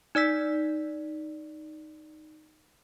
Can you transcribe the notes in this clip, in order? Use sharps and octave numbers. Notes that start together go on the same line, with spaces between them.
D#4 D5 E6 B6